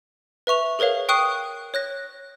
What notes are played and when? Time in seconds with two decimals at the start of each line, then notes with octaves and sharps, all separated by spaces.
0.47 B4 E5 C#6 F7
0.79 G#4 A#4 B4 C#5 F5
1.09 G5 C#6 D#6 F#6 C7 D#7
1.74 C#5 F#6 A#6